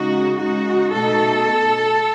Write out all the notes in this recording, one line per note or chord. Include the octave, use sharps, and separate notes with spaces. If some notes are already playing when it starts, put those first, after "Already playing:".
Already playing: C#3 G#3 D#4 F#4
C#3 G#3 D#4 F#4
B2 A3 D#4 A4